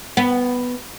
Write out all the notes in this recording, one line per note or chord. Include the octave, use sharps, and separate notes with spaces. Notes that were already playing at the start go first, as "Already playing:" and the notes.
B3